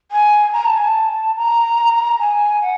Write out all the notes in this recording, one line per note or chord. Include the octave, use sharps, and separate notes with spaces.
G#5
A#5
A5
G#5
A5
A#5
G#5
F#5